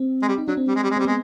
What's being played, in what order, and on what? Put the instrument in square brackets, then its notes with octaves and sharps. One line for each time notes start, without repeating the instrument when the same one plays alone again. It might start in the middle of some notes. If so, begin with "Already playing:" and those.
Already playing: [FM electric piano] C4
[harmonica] G#3
G3
[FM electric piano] D#4
[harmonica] F#3 [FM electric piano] D4
[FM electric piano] C4
[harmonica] G3
G#3
G3
G#3
[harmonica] G3 [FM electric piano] C4
[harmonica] G#3 [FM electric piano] B3